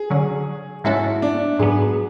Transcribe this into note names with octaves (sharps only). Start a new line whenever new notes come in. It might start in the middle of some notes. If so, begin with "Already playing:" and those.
Already playing: G#4
D3 F#3 C#4
G#2 G#3 C#4 E4 F#4 A4
D4
G#2 F#3 B3 G#4